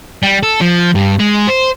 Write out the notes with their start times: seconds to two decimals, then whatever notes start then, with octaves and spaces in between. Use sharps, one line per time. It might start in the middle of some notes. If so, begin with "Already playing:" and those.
0.23 G3
0.43 A4
0.61 F3
0.95 G2
1.20 G#3
1.49 C5